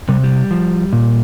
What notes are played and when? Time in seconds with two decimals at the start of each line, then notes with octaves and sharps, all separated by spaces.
0.09 C3 G3
0.24 G3
0.51 F3
0.93 A#2